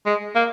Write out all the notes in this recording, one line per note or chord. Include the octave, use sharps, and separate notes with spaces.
G#3
A#3